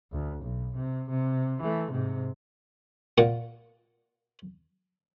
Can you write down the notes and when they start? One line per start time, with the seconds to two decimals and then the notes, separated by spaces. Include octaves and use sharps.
0.12 D2
0.43 B1
0.75 C3
1.10 C3
1.61 E3 A3
1.91 G#2 C3
3.18 A#2 F#5